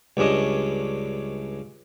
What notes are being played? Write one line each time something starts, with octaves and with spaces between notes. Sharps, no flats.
C#2 G2 C#4 D4 D#5